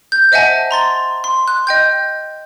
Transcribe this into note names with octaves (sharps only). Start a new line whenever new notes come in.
G6
C5 D#5 E5 F#5 G#5 A5
A#5 C6 A6 G7
C6
F#6
D#5 G5 G6